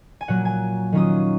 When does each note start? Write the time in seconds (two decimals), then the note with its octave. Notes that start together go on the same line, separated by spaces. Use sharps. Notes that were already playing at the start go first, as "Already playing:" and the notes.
0.21 G#5
0.28 A#2 F#3 A#3 F#5
0.45 G#5
0.92 D#3 F#3 C#4 F4 D#6